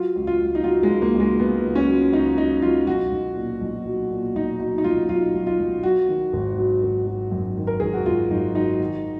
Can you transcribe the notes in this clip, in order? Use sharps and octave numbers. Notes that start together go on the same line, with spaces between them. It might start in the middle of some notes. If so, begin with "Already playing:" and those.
Already playing: F#3 F4
C#2
F4
C#2
D#4
F#3 F4
G#3
C#2
A#3
C#2
G#3
C#2 B3
C#2
C#4
F#3
C#2 D#4
F#3 D#4
F#3 F4
B1 F#4
B1
A#2
B1
F#3
A#2
B1 D#4
F#3 D#4
D#4
B1 F4
B1 F4
B1
F4
B1
F#3 F#4
D#3
G#1
F#3
G#1
F#3
F#2
D#3
A#4
G#1 G#4
F#4
G#1 F4
F#2 D#4
F#3 D#4
D#3